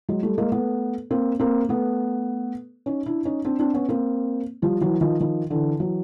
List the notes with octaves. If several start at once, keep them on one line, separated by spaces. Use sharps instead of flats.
F#3 G#3
G3 A3
G#3 A#3
A3 B3
A#3 C4
A#3 C4
A3 B3
C#4 D#4
D4 E4
C#4 D#4
C4 D4
C4 D4
B3 C#4
A#3 C4
F3 G3
E3 F#3
D#3 F3
D#3 F3
D3 E3
E3 F#3